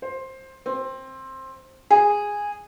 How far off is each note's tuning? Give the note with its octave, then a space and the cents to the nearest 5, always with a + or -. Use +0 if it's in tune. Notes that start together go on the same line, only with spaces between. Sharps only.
C5 +15
C4 +15
G#4 -10